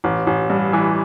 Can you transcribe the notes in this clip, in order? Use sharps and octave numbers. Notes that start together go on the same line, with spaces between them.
A1
A1
G2
E3